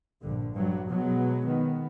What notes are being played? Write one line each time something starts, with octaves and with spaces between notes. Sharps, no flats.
A#1 G2 D3
G2 F#3
B2 F#3 G#3 B3
D#3 B3